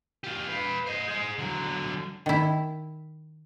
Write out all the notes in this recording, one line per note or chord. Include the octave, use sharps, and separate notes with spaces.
F4 G4
B4 F5
C5 D#5
G#4 C5
D3 F#3
D#3 E4